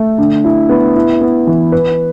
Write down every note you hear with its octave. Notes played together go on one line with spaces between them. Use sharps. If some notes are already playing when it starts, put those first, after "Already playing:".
Already playing: A3
D3
E4
B3
E4
B3
E3
B4